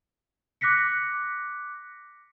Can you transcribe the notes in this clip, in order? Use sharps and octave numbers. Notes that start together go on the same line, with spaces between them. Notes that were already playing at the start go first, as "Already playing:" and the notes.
D6 F#6 A#6 B6 C#7